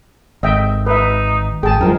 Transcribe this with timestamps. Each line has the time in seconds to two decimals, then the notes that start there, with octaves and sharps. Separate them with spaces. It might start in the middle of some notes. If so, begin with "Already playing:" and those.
0.43 G#1 D#5 E5 G5
0.86 D#4 B4 E5
1.63 G#1 G#4 G5 A5
1.81 F#2 F3 G#3 A#4